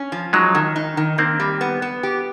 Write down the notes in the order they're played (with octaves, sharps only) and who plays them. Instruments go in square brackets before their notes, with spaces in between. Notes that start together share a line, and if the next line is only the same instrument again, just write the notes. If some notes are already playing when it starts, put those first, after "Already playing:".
Already playing: [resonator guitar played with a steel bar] C#4
F3
[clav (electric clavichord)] F#3 G#3 [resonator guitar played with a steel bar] D#4
[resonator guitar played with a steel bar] D#3
D#4
D#3
[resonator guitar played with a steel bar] D#3 [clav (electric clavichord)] A#3 C4
[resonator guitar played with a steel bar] G3
B3
B3
G4